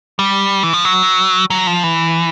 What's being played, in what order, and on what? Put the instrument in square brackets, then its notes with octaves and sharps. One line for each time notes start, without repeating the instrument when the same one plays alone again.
[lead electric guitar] G3
E3
F3
F#3
F#3
F3
E3